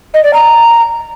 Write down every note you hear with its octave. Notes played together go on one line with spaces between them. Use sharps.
D#5
D5
A#5